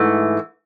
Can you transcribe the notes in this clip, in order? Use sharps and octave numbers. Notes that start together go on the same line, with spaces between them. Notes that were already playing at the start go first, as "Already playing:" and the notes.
Already playing: G#2 E3 A3